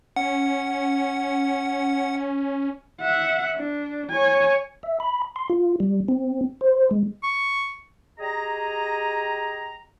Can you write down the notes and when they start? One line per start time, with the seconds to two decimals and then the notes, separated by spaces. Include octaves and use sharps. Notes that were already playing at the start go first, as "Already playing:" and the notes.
0.16 C#4 F#5
3.01 E5 F#5
3.56 D4
4.11 C#5 G#5
4.83 E5
5.00 B5
5.36 C6
5.50 F4
5.80 G3
6.08 C4
6.61 C5
6.91 G#3
7.23 C#6
8.19 G4 G#4 D#5 A#5